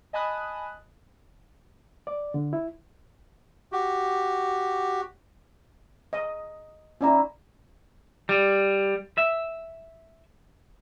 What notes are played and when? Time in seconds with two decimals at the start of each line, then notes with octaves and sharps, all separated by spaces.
0.13 D#5 G#5 A5 B5 D#6 F#6
2.07 D5
2.34 D3
2.53 E4
3.72 F#4 G4
6.13 D#5
7.01 C#4 D#4 E4 D5 A#5
8.29 G3
9.18 E5